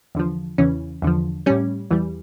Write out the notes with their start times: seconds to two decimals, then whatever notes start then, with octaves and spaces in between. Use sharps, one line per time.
0.15 E2 D3 F3
0.58 E2 C#3 E3 C#4
1.02 E2 D3 F3
1.46 A2 G3 C#4
1.90 E2 E3 G3